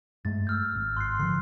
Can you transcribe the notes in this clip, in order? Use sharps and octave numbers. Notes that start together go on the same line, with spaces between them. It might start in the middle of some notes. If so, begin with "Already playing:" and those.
G2 G#3 A3 A6
E6 F6 G6
G#1
C6 F#6 C7
D3 F3 C7